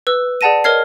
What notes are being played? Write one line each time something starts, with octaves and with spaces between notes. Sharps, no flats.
B4 E6
G#4 D5 F#5 A5 A#6 D#7
A#4 C#5 D#5 F6 G#6 C7